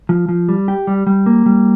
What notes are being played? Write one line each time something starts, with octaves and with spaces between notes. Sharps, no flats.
F3
F3
G3
G4
G3
G3
A#3
G3